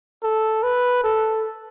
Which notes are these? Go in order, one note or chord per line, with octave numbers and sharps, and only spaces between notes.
A4
B4
A4